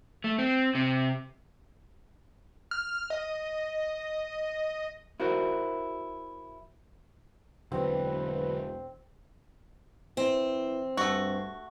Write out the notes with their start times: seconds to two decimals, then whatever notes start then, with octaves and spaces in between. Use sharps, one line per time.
0.24 A3
0.39 C4
0.75 C3
2.71 F6
3.10 D#5
5.20 E4 F#4 A#4 C5
7.72 E1 D3 F#3 C4 B4
10.17 E3 C4
10.97 G2 A3 F#4